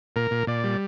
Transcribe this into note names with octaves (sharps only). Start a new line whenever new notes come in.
A#2 A#4
A#2
A#2 D5
G3